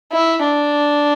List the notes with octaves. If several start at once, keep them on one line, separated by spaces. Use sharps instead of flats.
E4
D4